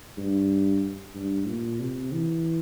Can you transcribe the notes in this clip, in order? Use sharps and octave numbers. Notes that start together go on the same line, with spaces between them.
G2
G2
A#2
C3
E3